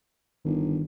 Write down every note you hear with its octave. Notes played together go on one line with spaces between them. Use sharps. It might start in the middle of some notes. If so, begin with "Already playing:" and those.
G1 D#3 D#4